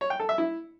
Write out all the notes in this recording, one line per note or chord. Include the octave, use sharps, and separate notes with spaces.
C#5
G5
A4
E5
E4